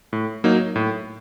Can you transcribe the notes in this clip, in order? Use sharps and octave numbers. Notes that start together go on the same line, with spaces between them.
A2
F#3 A#3 D#4
A2